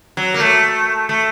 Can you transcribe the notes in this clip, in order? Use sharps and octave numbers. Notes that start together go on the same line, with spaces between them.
F#3
A#3
A3
A3